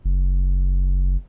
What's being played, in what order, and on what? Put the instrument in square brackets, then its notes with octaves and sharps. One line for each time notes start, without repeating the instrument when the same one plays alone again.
[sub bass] F#1